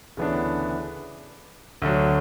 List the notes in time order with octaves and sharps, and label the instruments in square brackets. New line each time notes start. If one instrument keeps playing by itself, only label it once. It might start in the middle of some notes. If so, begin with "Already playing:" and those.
[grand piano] D2 C#3 E3 B3 D4
D2 D3 F#3